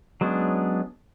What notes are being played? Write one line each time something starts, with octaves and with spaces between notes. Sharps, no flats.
F#3 G#3 B3 C#4 D4